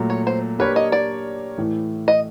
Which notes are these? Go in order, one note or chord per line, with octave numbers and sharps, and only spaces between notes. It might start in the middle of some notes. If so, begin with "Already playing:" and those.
Already playing: A#2 F#3 A3
C#5
C5
A#3 D4 G4 A#4 B4 C#5
D#5
D5
A2 E3 A3
D#5